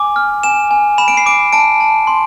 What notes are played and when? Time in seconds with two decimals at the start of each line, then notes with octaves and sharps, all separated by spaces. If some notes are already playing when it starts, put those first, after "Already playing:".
Already playing: G#5 D6
0.16 F6
0.43 G#5 E7
0.71 G#5
0.98 B5 E7
1.08 D7
1.17 C7
1.26 D6 D7
1.53 A5 D7
1.81 A5
2.07 C6